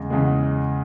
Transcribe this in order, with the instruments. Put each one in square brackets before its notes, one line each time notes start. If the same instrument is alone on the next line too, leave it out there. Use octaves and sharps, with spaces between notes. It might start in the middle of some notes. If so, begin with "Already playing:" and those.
Already playing: [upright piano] E2 C#3 G#3
E2 C#3 G#3